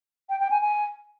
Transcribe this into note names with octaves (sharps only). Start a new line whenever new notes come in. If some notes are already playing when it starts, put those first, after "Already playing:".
G5
G5
G#5
G#5